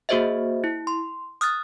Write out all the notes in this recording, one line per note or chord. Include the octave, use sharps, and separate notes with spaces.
A#3 F#4 G#4 C5 D#5 E5
E4
C6
D#6 F6 F#6 A6